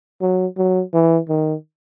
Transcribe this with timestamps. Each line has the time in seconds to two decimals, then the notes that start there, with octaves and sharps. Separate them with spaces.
0.21 F#3
0.58 F#3
0.94 E3
1.29 D#3